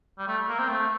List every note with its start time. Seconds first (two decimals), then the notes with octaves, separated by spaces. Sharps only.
0.18 G3
0.28 A3
0.49 A#3
0.59 C4
0.69 A3